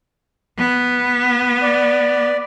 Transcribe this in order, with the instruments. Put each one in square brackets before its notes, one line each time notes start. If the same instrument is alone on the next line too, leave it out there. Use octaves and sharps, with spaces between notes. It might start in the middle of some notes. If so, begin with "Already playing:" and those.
[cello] B3
[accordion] D5